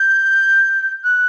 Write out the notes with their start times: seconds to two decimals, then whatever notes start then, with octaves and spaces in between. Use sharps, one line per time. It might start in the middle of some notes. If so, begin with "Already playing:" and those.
Already playing: G6
1.04 F#6